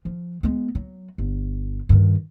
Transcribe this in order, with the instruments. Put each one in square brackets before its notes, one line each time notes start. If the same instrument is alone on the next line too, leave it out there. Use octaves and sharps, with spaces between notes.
[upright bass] F3
G#3 B3
F#3
G1
G2 D#3